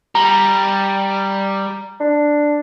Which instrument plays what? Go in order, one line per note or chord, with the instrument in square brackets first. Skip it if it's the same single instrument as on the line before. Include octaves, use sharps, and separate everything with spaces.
[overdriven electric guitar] G3 [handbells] A#5
[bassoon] D4